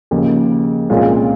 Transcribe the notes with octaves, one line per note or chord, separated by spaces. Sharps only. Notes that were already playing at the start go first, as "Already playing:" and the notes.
D#2 C#3 F3
C2 A#2 G#3 C#4 F4